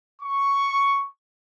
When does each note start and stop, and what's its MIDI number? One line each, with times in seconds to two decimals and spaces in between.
0.22 1.07 85